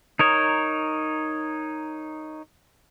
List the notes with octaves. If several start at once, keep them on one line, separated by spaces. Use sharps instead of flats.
D#4 A#4 C#5 D#6 E7 F7